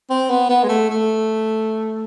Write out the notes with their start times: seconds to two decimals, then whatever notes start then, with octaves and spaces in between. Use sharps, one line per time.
0.10 C4
0.30 B3
0.49 B3
0.64 G#3
0.69 A3
0.90 A3